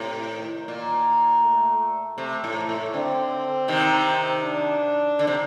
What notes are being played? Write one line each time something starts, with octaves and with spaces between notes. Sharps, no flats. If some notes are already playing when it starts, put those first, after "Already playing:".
Already playing: A2 C3
D#3
A#2
A3
C3 A3
A2
A3
A2
D3 C4
C3 D#3
D4
D3
C3